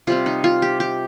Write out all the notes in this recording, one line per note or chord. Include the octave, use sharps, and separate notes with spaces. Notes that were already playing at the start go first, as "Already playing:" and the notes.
C3 G3 C4 F4
D#4
F4
G4
G4